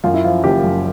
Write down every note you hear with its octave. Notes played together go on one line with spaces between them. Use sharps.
F#2 F4
E4
F3 F4
F#1 G4
F#2